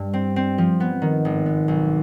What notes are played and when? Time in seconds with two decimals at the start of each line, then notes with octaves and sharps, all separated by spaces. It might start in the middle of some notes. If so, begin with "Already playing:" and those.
Already playing: G2
0.13 C4
0.36 C4
0.58 F3
0.80 B3
1.02 D#3
1.25 G#1
1.46 B3
1.68 B1